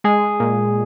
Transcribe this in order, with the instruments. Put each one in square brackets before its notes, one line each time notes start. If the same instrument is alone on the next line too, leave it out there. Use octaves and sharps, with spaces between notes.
[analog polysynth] G#3 [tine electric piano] G#4
[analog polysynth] A#2